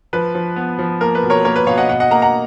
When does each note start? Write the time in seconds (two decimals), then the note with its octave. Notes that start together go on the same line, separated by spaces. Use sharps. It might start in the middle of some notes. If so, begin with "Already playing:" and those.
0.13 F3 B4
0.35 F3
0.56 B3
0.79 F3
1.01 A#3 A#4
1.15 B4
1.23 B2
1.30 A#4 C#5
1.45 A#3 A#4 C#5
1.56 B4
1.66 B2 C#5 F5
1.77 D#5 F#5
1.89 B2 D#5 F#5
2.00 D#5 F#5
2.11 A#3 F#5 A#5
2.22 F#5 A#5